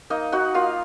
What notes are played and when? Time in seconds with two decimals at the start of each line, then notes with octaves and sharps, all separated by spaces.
0.10 A#3 D#4 D#5
0.32 D#4 F#4 F#5
0.55 A#3 F4 F5